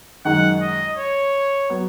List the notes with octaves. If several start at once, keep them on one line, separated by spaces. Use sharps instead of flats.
F#2 D#3 G#3 D#4 F#5
D#5
C#5
F#3 B3